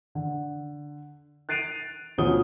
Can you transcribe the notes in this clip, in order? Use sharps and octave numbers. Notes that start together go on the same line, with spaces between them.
D3
F#6 A6 C7 D7 D#7 F7
D2 B2 F3 C#4 D#6 G7